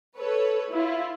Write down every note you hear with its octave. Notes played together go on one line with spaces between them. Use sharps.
A4 B4 C#5
E4 F4